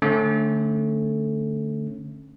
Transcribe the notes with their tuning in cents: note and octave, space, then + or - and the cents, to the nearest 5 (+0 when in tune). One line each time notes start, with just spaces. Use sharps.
D3 +0 A3 +0 C#4 -35